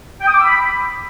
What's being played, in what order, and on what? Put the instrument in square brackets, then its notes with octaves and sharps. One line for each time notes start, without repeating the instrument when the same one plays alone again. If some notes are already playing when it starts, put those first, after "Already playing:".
[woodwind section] G5
D#6
D6
E6
B5